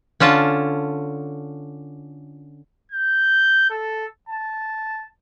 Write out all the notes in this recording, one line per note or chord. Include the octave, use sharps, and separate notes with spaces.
D3 C#4 F4 A5
G6
A4
A5